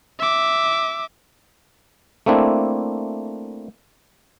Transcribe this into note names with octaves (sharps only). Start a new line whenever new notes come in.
E5 D6
A3 A#3 C4 D4 E4